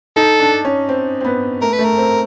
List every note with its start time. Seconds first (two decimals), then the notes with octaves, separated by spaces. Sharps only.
0.16 D#4 A4
0.40 D4
0.65 C#4
0.89 C4
1.20 C4
1.24 B3
1.61 A3 A#4
1.73 B4
1.79 A3
1.84 A#4
1.97 C4